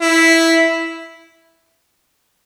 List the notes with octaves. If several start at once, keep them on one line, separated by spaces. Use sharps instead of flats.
E4